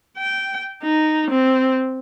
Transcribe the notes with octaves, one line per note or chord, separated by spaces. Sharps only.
G5
D#4
C4